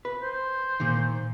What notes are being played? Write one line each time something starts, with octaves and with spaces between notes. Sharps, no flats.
B4
C5
A#2 D#3